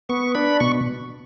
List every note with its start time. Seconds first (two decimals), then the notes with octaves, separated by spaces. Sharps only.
0.09 B3 C#6
0.35 D4 B5
0.60 B2 C#6